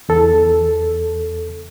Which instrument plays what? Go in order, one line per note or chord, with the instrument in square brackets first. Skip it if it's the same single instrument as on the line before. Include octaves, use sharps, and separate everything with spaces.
[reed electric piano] E2 A4